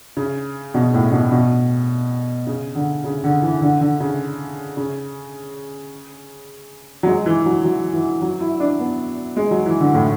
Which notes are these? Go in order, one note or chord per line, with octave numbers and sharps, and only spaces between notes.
C#3
B2
A2
B2
B2
C#3
D3
C#3
D3
E3
D3
D3
C#3
C#3
F#3
G#3
E3
F#3
F#3
E3
F#3
E4
D4
B3
G#3
F#3
E3
D3
A2